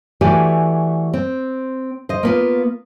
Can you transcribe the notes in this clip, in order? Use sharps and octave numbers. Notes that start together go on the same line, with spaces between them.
E3 A3 F#4 G4 D5 G#5
C4
C5 D#5
A#3 B3 F4